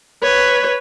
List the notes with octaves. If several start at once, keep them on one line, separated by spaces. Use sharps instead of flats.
B4 C#5